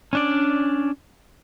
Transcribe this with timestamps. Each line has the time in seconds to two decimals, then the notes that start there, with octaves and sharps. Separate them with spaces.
0.13 C#4 D4 D5